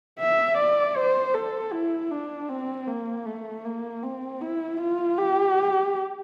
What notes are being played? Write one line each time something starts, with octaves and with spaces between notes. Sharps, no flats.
E5
D5
C5
A4
E4
D4
C4
A#3
A3
A#3
C4
E4
F4
G4